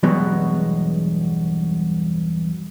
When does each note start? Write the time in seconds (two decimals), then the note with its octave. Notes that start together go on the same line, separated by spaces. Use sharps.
0.03 E2 G2 B2 F#3 G#3 B3